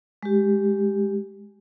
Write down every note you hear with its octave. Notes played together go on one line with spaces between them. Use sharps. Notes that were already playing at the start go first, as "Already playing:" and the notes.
G#3 G4